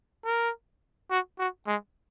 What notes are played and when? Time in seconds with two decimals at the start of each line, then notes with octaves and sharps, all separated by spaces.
0.25 A#4
1.11 F#4
1.39 F#4
1.67 G#3